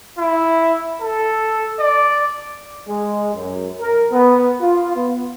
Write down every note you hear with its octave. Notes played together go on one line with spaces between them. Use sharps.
E4
A4
D5
G#3
F#2
A#4
B3
F4
B3